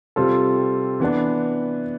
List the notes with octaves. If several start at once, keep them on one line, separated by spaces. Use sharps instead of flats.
C3 G3 C4 F4 A4
E3 B3 D4